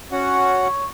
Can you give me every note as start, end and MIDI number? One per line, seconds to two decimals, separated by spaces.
0.12 0.68 61
0.12 0.68 66
0.12 0.88 73
0.12 0.68 78